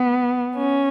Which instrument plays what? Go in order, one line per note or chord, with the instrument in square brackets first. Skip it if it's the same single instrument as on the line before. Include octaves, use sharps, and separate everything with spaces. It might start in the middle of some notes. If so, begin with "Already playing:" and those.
Already playing: [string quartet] B3
C#4